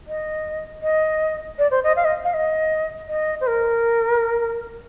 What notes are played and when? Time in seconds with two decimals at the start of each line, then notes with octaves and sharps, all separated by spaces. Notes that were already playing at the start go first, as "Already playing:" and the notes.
0.08 D#5
0.82 D#5
1.58 D5
1.71 C5
1.83 D#5
1.96 F5
2.05 D#5
2.24 F5
2.34 D#5
3.08 D#5
3.41 C5
3.47 A#4